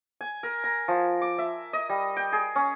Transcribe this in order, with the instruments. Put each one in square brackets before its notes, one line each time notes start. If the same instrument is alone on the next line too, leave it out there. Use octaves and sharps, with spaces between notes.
[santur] G#5
A#4
A#5
F3
D6
E5
D#5
G3
G5
G#4
C#4